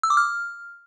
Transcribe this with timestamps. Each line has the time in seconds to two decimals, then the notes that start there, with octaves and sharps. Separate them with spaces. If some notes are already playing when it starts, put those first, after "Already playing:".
0.03 E6
0.10 D6
0.17 F6